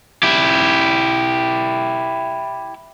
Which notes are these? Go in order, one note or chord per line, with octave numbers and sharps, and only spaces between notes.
E4 G4